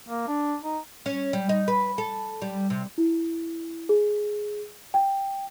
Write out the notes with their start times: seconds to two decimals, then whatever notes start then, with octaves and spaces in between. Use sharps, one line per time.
0.09 A#3
0.28 D4
0.63 D#4
1.06 C#4
1.33 G3
1.49 D#4
1.68 B4
1.98 A4
2.42 G3
2.70 C3
2.98 E4
3.89 G#4
4.94 G5